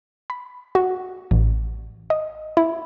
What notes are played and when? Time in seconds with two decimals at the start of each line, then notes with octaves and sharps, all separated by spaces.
0.30 B5
0.75 F#4
1.31 A1
2.10 D#5
2.57 E4